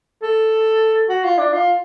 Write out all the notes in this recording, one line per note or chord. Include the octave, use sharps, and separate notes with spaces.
A4
F#4
F4
D4
F4